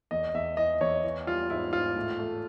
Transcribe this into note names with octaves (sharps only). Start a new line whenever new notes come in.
E2 D#5
E2 E5
E3 D#5
E2 C#5
E3
G3 F4
G#2 E4
G#2 F4
A2
A3